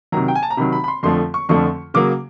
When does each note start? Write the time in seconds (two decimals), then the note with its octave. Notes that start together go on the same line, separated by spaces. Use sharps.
0.12 C3 D#3 F#3 A#5
0.28 G5
0.35 G#5
0.43 A5
0.50 A#5
0.57 C3 D#3 F#3 B5
0.73 B5
0.84 B5
0.88 C6
1.03 F2 D3 F3 A3 C6
1.34 C#6
1.49 F2 D3 F3 A3 C#6
1.94 C#3 F#3 A#3 D6